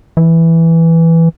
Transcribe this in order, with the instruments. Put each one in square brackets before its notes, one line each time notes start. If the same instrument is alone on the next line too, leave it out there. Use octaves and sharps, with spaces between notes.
[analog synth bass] E3